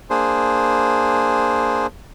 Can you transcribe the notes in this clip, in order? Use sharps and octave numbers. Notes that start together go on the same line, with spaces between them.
A#3 D4 G#4 C5